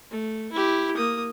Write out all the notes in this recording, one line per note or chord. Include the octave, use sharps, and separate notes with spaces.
A3
E4 G4
A#3 D#6